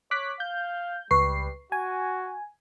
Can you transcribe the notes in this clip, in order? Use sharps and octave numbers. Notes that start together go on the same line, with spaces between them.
C#5 D6 F#6 B6
F5 G6
C#2 G3 B4 C#6 C7
F#4 G#5